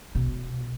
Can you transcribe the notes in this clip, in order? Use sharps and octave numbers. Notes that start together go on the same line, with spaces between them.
B2